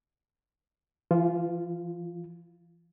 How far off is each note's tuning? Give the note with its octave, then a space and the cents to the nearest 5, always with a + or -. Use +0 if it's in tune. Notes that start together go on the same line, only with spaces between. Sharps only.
E3 +45 F4 +0